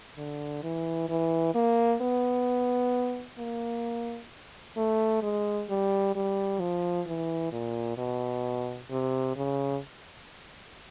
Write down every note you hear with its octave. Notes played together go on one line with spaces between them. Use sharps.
D3
E3
E3
A#3
B3
A#3
A3
G#3
G3
G3
F3
E3
A#2
B2
C3
C#3